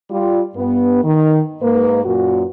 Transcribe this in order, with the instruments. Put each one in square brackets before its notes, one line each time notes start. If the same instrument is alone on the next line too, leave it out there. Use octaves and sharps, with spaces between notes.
[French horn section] G3 F4
G2 B3
D#3
G#2 A#3 B4
F#2 A#2 F#4